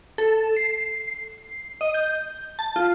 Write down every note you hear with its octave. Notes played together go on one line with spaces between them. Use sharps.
A4
C7
D#5
G6
A5
F4